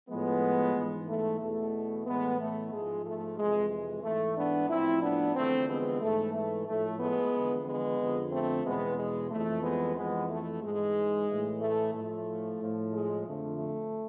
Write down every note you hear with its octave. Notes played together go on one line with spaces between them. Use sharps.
A2 F3 G#3 B3
G#2 E3
A3
E2 B2 A3
A2 E3 G#3 B3
A3
G#2 F3 G#3
A3
F2 C3 E3 G#3
G#3
G#2 E3 A3
B3 D4
A2 F3 C4 E4
B3 D4
E2 D3 F3 A3 C4
G#3 B3
G#2 E3 A3
A3
A2 F3 A3
G#3 B3
E2 D3 F3
G#3 B3
F2 D3 F3
A3 C4
E2 B2 G#3 B3
G#3
F2 E3 A3
G#3 B3
F2 E3 G#3 B3
A3
G#2 E3 G#3
A2 E3
A3
A2 F3 A3
A2 F3
G#3
F2 D3 F3 A3
A3